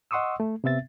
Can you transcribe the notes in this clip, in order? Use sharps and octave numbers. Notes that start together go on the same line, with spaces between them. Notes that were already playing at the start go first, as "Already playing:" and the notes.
D#5 F#5 C6 C#6 D#6 E6
A3
C3 B3 C4 E5 A6